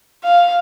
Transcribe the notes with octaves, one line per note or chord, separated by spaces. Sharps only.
F5